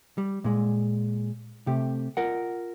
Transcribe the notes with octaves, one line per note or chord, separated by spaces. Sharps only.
G3
A#2 G#3
C3 A3 G4
F4 A#4 F#5